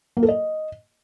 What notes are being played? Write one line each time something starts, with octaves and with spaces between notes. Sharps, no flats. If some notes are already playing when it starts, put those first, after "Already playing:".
A#3
A4
D#5